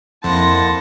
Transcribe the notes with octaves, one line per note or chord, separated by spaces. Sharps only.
F2 A#3 E4 F#5 A5 C6 A#6